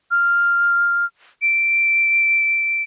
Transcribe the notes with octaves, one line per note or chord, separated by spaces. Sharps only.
F6
D7